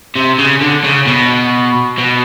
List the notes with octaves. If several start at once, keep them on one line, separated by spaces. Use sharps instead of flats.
C3
C#3
D3
C#3
B2
B2